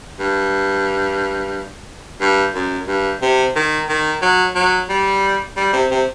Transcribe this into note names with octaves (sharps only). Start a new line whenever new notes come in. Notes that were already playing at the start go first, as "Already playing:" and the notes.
G2
G2
F#2
G2
C3
D#3
D#3
F#3
F#3
G3
G3
C3
C3